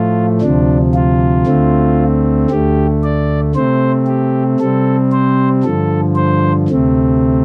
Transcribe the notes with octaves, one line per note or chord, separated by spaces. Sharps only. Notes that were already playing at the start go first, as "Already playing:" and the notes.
Already playing: A2 F3 A3 F4
D2 C3 F3 D4
F4
D2 D3 A3 C4
D2 D3 A3 G4
D5
C3 A3 C4 C5
G4
C3 G3 C4 A4
C5
G2 D3 F3 A4
C5
D2 C3 A3 C4